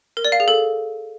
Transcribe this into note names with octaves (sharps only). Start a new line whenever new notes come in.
A#4
D5
F5
G#4
A4